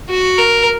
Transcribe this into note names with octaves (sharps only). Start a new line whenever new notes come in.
F#4
A#4